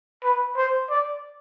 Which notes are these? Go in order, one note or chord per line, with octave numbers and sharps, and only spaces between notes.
B4
C5
D5